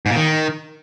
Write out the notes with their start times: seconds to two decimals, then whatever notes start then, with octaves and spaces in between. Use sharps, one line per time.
0.06 G#2
0.11 A#2
0.16 D#3